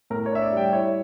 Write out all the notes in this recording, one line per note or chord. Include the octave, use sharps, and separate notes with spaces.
A2 A#4
C#5
D4 E5
D5
G3 G5
E4 C#5